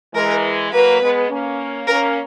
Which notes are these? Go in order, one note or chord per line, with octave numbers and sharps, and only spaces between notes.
E3 G#3 A#4
F#3 A#3 B4
G#3 B3
A#3 C#4
A#3 C#4 A#4